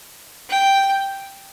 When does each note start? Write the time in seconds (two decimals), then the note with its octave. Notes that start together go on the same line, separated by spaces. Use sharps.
0.50 G5